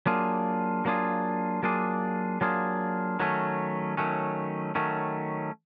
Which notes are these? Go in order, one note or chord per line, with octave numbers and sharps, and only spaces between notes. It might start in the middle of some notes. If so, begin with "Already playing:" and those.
F#3 A#3 D4 F4 G#4
F#3 A#3 D4 F4 G#4
F#3 A#3 D4 F4 G#4
F#3 A#3 D4 F4 G#4
D#3 F#3 A3 C#4
D#3 F#3 A3 C#4
D#3 F#3 A3 C#4